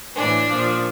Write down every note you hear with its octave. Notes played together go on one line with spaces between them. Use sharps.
A2 E3 D4
A#2 F3